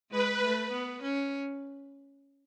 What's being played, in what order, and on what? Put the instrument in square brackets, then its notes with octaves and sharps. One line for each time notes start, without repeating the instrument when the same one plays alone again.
[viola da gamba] G#3 [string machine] B4
[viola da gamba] A3
B3
C#4